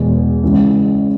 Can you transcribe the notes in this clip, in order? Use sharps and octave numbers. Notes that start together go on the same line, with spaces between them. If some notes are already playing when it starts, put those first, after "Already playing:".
Already playing: E2 B2 G#3
C#2 C#3 E3 G#3